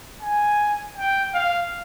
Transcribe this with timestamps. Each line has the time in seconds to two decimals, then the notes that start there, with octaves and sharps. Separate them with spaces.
0.22 G#5
0.97 G5
1.34 F5